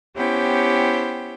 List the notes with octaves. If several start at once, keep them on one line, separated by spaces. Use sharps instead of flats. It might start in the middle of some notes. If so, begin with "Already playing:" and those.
B3 C#4 E4 G4 C5 G5